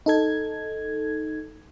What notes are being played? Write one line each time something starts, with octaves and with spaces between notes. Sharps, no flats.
D#4 A4 G#6